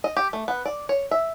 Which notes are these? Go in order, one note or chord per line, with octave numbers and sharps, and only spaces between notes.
D#5
G4
A3
B3
D5
C#5
E5